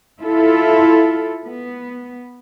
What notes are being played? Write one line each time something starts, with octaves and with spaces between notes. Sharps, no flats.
E4 F4 A4
B3